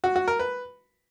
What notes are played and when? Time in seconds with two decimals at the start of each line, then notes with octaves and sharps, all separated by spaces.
0.04 F#4
0.16 F#4
0.28 A#4
0.40 B4